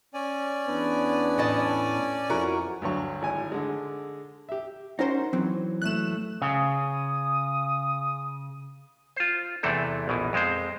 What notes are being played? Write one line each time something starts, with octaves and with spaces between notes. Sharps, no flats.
C#4 D5 G#5
E2 B3 D4
A2 D#5 A5
F2 E4 F#4 A#4
D2 G2 F#3 C#6
G#1 A2 G#5
D3 G#3
G4 E5
C#4 D#4 F#4 A#4 C5
E3 F#3 C4
A3 F#6 E7
C#3 D#6
F4 C5
E2 C3 E3 A3 C4 A4
A#1 B2 E3
F2 G#3 C4 C5